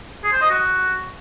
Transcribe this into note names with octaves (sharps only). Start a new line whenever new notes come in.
G#4
C5
D#5
F#4